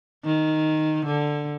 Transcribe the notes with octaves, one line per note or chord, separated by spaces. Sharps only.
D#3
D3